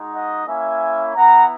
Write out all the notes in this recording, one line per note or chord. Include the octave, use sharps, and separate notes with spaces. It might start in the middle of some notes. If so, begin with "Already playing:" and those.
Already playing: G#3 D#4 F#4
D#5 F#5
A#3 C#4 E4 E5 G#5
B3 E4 F#5 A#5